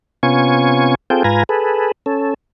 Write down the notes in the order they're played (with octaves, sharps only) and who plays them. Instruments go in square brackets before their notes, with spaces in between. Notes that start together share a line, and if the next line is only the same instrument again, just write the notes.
[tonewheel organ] C3 B3 C#4 F4 G#5 C#6
C4 F4 G#4 A4 G5
G#2 F4 B4 G#5 A#5
G#4 A4 B4
C#4 A4